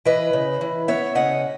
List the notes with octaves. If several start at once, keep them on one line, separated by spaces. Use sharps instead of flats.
E3 B4 D#5
C#3
E3
B3 C#5 E5
C#3 D#5 F#5